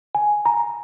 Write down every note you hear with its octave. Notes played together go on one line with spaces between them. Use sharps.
G#5
A#5